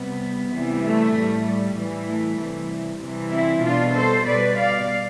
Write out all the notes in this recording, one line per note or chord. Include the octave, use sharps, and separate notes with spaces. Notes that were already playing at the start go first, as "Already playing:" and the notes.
Already playing: C3 G3 B3
C3 E3 G3
A3
A2 G3
G3
A2 E3 G3
A3
C3 E3 G3
C3 E3 G3
C4 E4
B2 G3 D4 F4
A4 C5
B2 G3 B4 D5
D5 F5